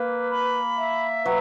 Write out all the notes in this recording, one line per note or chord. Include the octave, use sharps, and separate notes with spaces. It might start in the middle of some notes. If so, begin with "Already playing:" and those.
Already playing: A#3 B4
B5
E5
F#3 B4